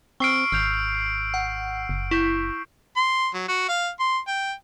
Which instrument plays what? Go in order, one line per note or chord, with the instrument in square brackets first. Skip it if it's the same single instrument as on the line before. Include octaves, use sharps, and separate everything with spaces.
[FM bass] C4 [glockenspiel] C#6 F6 [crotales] E6 C7 D7
[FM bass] G#1 [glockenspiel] F6 G6 F7
[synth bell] F#5
[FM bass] F#1
[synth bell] E4 [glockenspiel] C#6 G6
[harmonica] C6
F#3
F#4
F5
C6
G5